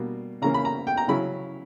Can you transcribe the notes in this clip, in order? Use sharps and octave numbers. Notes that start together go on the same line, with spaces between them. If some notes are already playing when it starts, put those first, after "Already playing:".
Already playing: B2 G3 A#3 D4
C#3 E3 A#3 C#4 A#5
B5
A#5
G5
A#5
C#3 F#3 C#4 E4 B5